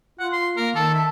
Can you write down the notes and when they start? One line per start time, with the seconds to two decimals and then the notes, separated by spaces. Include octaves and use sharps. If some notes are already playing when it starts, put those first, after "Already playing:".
0.19 F4 F#5
0.33 C6
0.57 A#3 A#4
0.76 D#3 A4 A5
0.94 E5